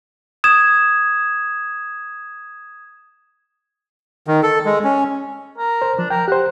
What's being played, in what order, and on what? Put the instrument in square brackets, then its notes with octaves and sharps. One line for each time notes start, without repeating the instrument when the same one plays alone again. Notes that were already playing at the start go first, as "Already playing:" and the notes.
[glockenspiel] D#6 G#6 E7
[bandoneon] D#3
A4
G#3
C#4
[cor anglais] A#4
[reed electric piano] C5
[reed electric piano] F3 [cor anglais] D4
[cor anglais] A#4 [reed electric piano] G5
[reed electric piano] G4 C5 [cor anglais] F#5